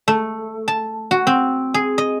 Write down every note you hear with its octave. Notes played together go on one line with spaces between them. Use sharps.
A3
A5
F#4
C4
G#4
D#5